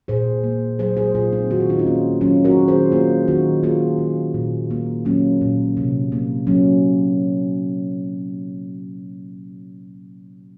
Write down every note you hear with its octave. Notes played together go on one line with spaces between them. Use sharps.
A#2 G#4 C5
A#3
F#3 G#4 C5
G#4 C5
A#2 F4 G#4
C4 D#4
D#3 F#4
F4
D#4
C#4 F4
A#3
F#3 C#4 F4
F#4 A#4
D#3
G#4 C5
A#3 F4 G#4
D#3 D#4 F#4
A#3 F4 G#4
D#3
A#2
A#3
F#3 A#3 C#4
A#2
C3
A#3
F#3 A#3 C#4